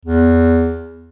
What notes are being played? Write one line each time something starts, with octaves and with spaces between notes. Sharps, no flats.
E2